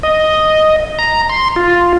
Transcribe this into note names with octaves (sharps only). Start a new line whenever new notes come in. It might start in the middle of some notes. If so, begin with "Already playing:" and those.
D#5
A#5
C6
F4